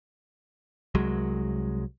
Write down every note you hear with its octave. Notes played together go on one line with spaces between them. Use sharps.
C2 F#3 G#3